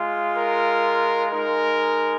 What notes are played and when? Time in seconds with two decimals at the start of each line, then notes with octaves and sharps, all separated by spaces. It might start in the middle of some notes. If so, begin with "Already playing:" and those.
Already playing: G#3 F4
0.35 A#4
1.31 G#3 D#4 A#4